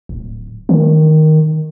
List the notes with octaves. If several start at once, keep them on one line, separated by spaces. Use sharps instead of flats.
D1
D#3